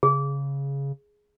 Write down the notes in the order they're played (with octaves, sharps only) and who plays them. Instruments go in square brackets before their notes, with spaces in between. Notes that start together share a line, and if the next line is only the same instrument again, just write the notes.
[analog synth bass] C#3 [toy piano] G#4